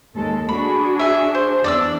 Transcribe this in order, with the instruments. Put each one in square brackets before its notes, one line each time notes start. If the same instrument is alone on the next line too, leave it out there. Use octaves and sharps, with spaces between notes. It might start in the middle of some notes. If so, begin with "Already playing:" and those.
[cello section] D#2 G#3 A4
[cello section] D4 F#4 G#4 [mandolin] B5
[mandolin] E5 G#5
C5
[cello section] E2 D4 [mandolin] D5 D6 E6